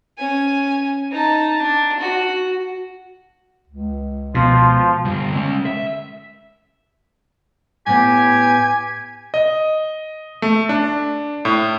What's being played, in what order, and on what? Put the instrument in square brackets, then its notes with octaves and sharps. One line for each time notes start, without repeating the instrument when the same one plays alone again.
[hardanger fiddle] C#4 G#5
D#4 A5
D4
F#4
[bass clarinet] C#2
[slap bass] B2 [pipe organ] F3 F4
[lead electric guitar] D3 G3
G#3 C#4
E5
[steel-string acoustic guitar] A2 B3 E4 [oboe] G4 [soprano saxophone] G#5
[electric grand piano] D#5
A3
D4
A2